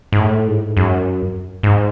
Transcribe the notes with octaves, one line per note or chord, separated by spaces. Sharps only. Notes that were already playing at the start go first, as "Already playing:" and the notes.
G#2
A2
G#2
F#2
G#2